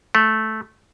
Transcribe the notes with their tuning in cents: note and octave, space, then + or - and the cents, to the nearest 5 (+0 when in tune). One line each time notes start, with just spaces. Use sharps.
A3 -10